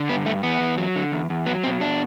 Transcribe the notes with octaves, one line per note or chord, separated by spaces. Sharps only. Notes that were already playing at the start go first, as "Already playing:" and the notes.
Already playing: D3
G2 B3
G2 A3
E2 B3
E2
F#3
D3
E2
E2
F#3 B3
B2 C4
B2 D4